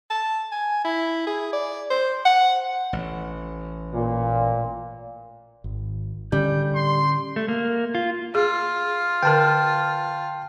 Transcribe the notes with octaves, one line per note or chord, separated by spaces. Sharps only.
A5
G#5
E4
G#4
D5
C5
F#5
A1
A#2
G#1
A2 D3 G3 C#4 G6
C6
A3
A#3
F4
F4 G#4
D3 A#4 G5 A5